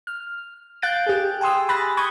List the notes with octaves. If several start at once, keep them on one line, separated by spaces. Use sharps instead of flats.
F6
F5 F#6 G6 A6 D7
G4 G#4
G5 G#5 C6 D#6 E6
B5 F#6 A6 A#6
B5 C#6 D#6 G6 G#6